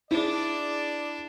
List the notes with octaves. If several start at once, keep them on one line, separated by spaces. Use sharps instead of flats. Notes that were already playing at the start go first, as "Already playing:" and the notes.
D4 E4 G#4 D5